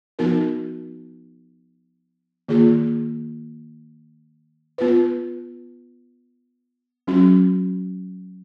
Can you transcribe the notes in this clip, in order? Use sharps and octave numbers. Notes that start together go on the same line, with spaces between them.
F3 B3 D#4 F#4 A#4
D#3 A#3 F4 G#4
B3 F4 B4
F#3 C#4 F#4